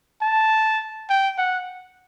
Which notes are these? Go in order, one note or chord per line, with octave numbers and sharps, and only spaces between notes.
A5
G5
F#5